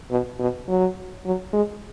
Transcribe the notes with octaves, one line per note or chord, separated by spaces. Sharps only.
B2
B2
F#3
F#3
G#3